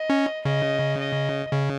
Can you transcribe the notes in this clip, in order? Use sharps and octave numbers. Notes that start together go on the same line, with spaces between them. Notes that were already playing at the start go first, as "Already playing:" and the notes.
Already playing: D#5
C#4
C#3 D#5
D#5
C#3